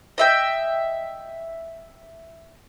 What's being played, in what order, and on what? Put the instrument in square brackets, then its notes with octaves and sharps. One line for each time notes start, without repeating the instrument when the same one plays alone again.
[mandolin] D#5 E5 G5